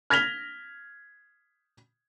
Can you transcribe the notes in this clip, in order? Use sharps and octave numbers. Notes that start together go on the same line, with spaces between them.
F6 G#6 A#6 B6 F7 G7